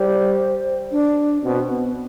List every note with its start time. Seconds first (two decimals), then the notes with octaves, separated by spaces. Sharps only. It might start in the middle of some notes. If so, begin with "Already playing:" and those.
Already playing: G3 C5
0.92 D4
1.44 B2 C4
1.69 B3